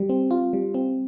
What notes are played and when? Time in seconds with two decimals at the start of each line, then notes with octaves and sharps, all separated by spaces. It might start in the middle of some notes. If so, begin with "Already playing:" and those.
Already playing: G3
0.09 C4
0.31 F4
0.53 G3
0.74 C4